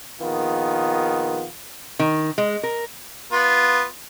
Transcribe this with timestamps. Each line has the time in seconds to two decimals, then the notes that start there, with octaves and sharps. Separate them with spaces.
0.21 A#1 D#3 B3 F4
1.99 D#3
2.38 G#3
2.63 A#4
3.32 B3 F4